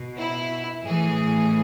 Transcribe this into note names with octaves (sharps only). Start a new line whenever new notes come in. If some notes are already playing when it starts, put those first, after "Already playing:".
Already playing: B2
E4
A2 E3 G#4